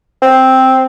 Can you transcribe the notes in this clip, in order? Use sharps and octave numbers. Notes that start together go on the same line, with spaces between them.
C4